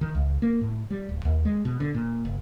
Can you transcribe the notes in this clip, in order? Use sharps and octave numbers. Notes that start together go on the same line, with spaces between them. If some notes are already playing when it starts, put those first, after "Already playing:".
D#3
C#2
A#3
A2
G3
D1
D#2
G#3
B2
D3
A#2
F#1